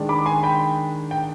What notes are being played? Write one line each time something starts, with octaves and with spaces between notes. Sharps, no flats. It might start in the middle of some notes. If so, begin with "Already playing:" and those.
Already playing: D#3 G#3 D4
B5 D6
G#5 C6
G5 B5
G5